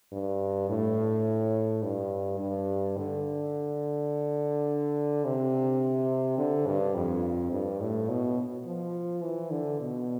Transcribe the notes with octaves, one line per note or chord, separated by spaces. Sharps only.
G2
A2
G2
G2
D3
C3
D3
G2
F2
G2
A2
B2
F3
E3
D3
B2